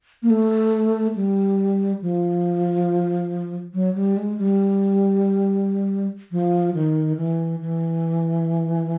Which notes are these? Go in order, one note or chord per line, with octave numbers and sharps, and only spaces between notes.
A#3
A3
G3
F3
F#3
G3
G#3
G3
F3
D#3
E3
E3